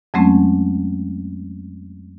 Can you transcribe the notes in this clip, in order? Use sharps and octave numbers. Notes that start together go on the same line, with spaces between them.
F2 F#3 G#3 A3 C4 C#4